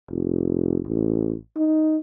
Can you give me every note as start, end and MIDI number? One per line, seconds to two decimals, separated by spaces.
0.11 0.80 29
0.86 1.34 33
1.56 1.97 63